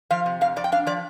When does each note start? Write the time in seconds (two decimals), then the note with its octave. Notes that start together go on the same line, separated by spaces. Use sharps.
0.11 F3 F5
0.26 C3
0.41 F2 F5
0.56 F2 D5
0.64 G5
0.72 D4 F5
0.87 F3 D5